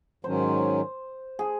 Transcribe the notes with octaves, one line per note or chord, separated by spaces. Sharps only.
G#2 D#3 F#3 C#4 C5
G#4